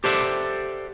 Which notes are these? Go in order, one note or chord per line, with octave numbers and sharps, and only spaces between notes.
G4 A4 C5 D5 E5 F#5